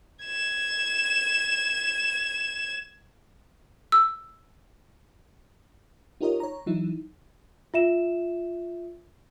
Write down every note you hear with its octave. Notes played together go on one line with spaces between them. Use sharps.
G#6 E7
E6
D#4 F4 G4 A#4 C#5 D#5
C#5 A#5
E3 F#3 D#4 E4
F4 E5 E7